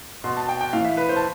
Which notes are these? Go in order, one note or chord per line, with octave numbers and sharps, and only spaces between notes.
B2 C6
A5
G5
G5
A2 E3 F5
E5
B4
C5
A5